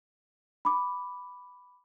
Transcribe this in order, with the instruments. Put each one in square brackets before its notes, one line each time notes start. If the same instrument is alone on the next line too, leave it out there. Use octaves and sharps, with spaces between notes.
[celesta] B5 D6